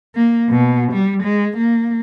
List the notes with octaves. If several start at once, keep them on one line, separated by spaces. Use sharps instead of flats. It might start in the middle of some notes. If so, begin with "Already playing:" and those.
A#3
B2
G3
G#3
A#3